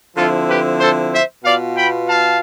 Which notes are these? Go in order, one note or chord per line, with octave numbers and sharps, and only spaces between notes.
D3 F3 C4 E4 F4 A4
G4 B4
A4 C5
C5 E5
B2 B3 F4 D5 F5
G5 B5
F5 A5